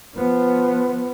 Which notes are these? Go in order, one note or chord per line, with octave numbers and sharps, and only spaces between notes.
F3 B3